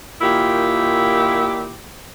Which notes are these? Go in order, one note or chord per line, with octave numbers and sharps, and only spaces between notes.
A#2 D#3 E4 F4 G4